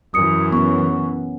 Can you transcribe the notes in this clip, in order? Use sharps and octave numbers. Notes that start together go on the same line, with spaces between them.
F#2 E3 D#6 C#7
B3 C#4 C#6